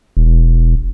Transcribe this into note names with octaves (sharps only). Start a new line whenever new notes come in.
E1